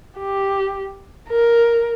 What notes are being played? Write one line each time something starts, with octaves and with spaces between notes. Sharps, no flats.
G4
A#4